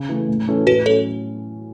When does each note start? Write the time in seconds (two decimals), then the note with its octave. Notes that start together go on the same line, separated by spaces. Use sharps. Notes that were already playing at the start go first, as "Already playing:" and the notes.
Already playing: C#3
0.09 E3 A3
0.28 A2
0.48 E3 C#4 A4
0.67 A2 F#4 B4
0.86 F#3 C#4 A4 C#5